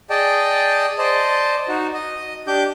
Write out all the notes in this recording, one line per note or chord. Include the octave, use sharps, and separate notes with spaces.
G#4 D5 D#5 G5 A5
C5 D5 D#5 A5
D#4 F#4
D#5
D4 G4 D6 G6